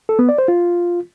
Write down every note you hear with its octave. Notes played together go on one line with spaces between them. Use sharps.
A4
B3
D5
C5
F4